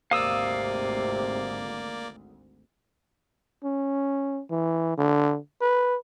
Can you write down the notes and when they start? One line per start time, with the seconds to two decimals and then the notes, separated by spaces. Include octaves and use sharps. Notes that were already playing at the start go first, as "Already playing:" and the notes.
0.11 G#1 D2 C3 A#3 D5 F5 D#6 E6
3.64 C#4
4.50 E3
4.97 D3
5.61 B4